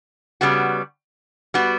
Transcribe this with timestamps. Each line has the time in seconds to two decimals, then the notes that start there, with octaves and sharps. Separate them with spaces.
0.41 C#3 G3 B3 F#4
1.54 G3 B3 F#4